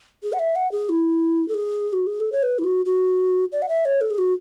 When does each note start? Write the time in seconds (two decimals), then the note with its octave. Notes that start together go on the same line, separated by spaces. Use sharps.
0.23 G#4
0.33 F#5
0.39 E5
0.56 F#5
0.72 G#4
0.89 E4
1.48 A4
1.54 G#4
1.93 F#4
2.07 G#4
2.20 A4
2.32 C#5
2.43 B4
2.59 E4
2.64 F#4
2.86 F#4
3.52 D5
3.62 F#5
3.69 E5
3.85 C#5
4.01 A4
4.11 G#4
4.18 F#4